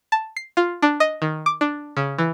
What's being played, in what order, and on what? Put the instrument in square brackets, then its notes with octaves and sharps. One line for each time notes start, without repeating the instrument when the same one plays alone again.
[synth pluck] A5
C7
F4
D4
D#5
D#3
D6
D4
C#3
E3